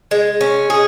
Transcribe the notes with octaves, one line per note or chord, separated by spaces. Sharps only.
G#3
C#4
G#4